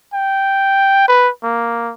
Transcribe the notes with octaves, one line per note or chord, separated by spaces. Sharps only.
G5
B4
A#3